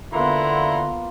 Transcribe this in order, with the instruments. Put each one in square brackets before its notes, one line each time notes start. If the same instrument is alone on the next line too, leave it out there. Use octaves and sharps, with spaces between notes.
[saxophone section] D3 [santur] A#3 B3 F4 [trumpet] E4 [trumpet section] F#5 A#5 C6